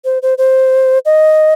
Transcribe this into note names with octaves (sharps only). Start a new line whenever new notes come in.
C5
C5
C5
D#5